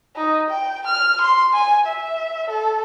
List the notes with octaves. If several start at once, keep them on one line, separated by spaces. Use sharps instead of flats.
D#4
G5
F6
C6
G#5
E5
A4